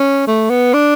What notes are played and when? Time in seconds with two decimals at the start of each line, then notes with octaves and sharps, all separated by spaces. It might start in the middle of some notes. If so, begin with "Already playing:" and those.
Already playing: C#4
0.27 A3
0.50 B3
0.74 D4